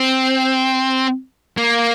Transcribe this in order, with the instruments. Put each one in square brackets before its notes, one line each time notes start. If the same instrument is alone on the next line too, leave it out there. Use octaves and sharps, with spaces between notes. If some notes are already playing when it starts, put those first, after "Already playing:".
Already playing: [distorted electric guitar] C4
A#3